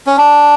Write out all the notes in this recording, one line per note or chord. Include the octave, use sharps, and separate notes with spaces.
C#4
D4